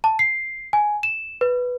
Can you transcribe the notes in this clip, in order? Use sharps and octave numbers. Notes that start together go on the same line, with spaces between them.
A5
C7
G#5
E7
B4